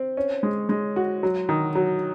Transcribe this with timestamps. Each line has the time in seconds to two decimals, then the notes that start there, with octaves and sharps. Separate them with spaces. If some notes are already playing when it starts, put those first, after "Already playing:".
Already playing: C4
0.17 C#4
0.43 G#3
0.69 G#3
0.96 F#4
1.23 F#3
1.49 D#3
1.75 F#3